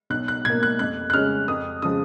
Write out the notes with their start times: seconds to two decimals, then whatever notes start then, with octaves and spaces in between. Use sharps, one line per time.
0.10 B1 F#6
0.28 F#6
0.45 B2 G#6
0.50 A#3
0.63 F#6
0.79 F2 F#6
1.10 F#6
1.13 C#3 G#3 C#4 F6
1.48 F2 D#6
1.82 C#3 F3 G#3 D#6